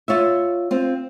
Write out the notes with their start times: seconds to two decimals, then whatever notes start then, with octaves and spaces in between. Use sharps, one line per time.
0.08 F4 C#5 E5
0.71 C4 F4